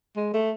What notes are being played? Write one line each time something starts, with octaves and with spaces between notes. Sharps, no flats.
G#3
A3